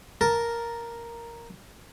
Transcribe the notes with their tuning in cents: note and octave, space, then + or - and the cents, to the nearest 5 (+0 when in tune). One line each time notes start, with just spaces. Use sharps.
A#4 +0 A5 +0